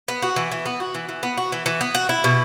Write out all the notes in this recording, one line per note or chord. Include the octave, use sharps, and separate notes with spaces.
B3
F#4
E3
E3
B3
F#4
E3
E3
B3
F#4
E3
E3
B3
F#4
E4
B2